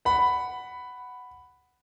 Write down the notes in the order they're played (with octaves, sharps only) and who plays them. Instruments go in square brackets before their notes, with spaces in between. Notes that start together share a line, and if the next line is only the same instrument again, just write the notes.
[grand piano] F#5 B5